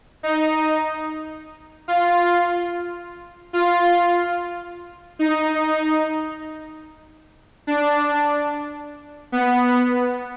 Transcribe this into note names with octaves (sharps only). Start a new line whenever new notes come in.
D#4
F4
F4
D#4
D4
B3